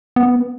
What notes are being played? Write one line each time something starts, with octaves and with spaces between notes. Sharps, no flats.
B3